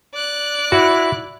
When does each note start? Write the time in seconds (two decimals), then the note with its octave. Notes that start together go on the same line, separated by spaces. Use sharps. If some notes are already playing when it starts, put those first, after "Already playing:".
0.14 D5 F#6
0.72 E4 F#4